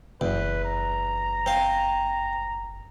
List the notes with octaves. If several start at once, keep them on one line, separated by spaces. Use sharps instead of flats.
F#1 E2 B4
A#5
C4 F5